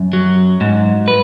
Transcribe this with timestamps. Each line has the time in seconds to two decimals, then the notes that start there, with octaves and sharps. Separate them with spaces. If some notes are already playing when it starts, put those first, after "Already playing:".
Already playing: F#2
0.13 F#3
0.61 G#2
1.08 B4